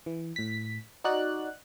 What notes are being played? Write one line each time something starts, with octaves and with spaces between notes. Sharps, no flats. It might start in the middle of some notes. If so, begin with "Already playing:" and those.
E3
A2 B6
D#4 F#4 D5 F#6